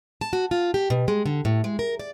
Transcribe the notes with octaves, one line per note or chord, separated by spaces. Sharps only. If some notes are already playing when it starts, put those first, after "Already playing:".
A5
F#4
F4
G4
B2
G#3
D3
A2
G#3
A#4
D5